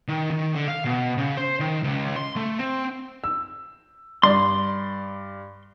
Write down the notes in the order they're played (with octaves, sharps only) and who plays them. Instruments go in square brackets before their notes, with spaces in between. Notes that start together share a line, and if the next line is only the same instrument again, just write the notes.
[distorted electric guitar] D#3
D#3
D3
F5
B2
C#3
C5
D#3
C#2
C6
A3
C4
[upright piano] E6
[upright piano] G2 D5 [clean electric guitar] C6